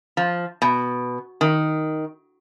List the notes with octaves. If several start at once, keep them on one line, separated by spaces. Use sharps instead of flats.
F3
B2
D#3